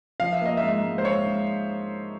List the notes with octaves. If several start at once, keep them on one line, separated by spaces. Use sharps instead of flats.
F3 F5
E5
A#3 D#5
G#2 E5
G#2
C5
G#2 C#5
G#2